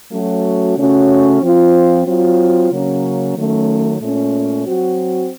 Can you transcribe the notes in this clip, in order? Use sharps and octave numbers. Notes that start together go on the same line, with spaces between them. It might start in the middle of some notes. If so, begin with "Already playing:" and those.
F#3 A3 C#4 F#4
C#3 A3 C#4 F#4
F3 C4 F4
F#3 C4 F4
C#3 F#3 A#3 C#4
D#3 F#3 A3 C#4
A#2 A3 C#4
F#3 C4 F#4